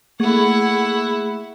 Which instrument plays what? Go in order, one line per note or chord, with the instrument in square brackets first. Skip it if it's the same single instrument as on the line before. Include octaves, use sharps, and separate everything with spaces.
[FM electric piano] A3 A#3 C#6 [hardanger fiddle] E4 F#5 [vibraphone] G#4